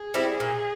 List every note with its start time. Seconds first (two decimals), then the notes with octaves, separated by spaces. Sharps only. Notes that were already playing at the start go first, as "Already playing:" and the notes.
Already playing: G#4
0.14 G3 C4 E4
0.40 A#2